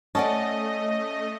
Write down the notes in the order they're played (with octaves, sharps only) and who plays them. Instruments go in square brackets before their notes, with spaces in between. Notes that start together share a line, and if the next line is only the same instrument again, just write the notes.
[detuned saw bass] A3 [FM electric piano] C#4 [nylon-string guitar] D5 F#5 A5 [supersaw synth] D#5